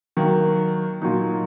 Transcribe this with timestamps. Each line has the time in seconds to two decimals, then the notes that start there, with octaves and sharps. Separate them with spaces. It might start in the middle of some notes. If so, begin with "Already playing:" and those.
0.17 D#3 F#3 A#3
1.02 A#2 F#3 D#4